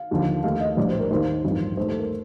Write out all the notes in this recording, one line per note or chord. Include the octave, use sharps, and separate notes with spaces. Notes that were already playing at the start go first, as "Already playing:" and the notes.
Already playing: F5
D#2 D3 F3
D#2 D#3 A3 F5
D#5
A#1 A2 G3 D4 D5
C5
A#4
D#2 D#3 A#3 C5
A1 G2 F3 C4 D#4
D#2 D#3 A3 C5
A4
A#4